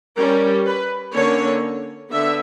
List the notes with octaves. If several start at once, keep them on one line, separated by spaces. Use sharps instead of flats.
G3 C#4 A#4
B4
D3 A#3 C#4 C#5
D3 B3 E5